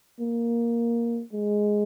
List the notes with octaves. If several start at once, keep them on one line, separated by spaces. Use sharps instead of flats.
A#3
G#3